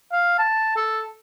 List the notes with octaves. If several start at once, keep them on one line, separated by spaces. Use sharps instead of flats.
F5
A5
A4